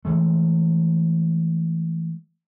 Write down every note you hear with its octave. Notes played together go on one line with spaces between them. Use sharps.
E3 G#3 A3